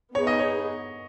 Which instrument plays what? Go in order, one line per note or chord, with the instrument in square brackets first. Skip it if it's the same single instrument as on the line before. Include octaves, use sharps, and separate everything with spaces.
[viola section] B3 D#4 G#4 B4 [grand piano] C#5
[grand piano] D#5
C#5